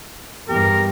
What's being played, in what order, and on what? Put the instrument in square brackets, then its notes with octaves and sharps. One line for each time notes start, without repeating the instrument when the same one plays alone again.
[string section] E2 G2 [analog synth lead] G4 [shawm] A#4